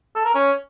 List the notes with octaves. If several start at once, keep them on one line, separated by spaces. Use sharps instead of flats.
A4
A#4
C#4